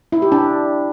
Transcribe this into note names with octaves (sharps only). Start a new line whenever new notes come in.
E4
G4
D4